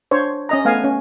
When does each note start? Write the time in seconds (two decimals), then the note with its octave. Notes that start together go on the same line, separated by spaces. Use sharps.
0.11 D4 C5 C#5
0.49 C#4 D#5 A#5
0.65 A3 B3 F5 G#5
0.84 C#4